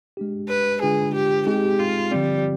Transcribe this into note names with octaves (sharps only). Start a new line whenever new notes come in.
G#3 D4 G4
B4
D3 G#3 D4 F4 G#4 B4
G4
G#3 C4 D#4 G4 G#4
F4
D3 F3 G3 C4